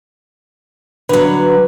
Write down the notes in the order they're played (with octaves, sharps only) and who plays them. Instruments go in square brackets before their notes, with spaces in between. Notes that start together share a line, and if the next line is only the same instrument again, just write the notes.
[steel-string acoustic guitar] D3 F#3 [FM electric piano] B4